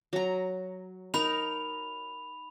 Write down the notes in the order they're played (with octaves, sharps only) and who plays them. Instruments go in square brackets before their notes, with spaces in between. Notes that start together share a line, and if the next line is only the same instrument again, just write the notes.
[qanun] F#3 A#5
[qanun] D#4 A#4 [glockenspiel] B5 F7